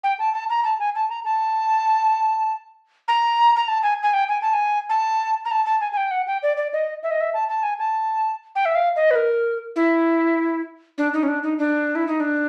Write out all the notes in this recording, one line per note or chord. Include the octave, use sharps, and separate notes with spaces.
G5
A5
A5
A#5
A5
G#5
A5
A#5
A5
A#5
A#5
A5
G#5
G#5
G5
G#5
A5
G#5
A5
A#5
A5
A5
G#5
G#5
G5
F#5
G5
D5
D5
D#5
E5
D#5
E5
A5
A5
G#5
A5
G5
E5
F5
D#5
B4
A#4
E4
D4
D#4
C#4
D4
D#4
D4
E4
D#4
D4